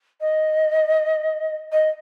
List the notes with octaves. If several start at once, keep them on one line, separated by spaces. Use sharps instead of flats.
D#5
D#5